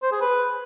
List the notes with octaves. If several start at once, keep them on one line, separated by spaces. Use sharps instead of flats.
C5
G#4
B4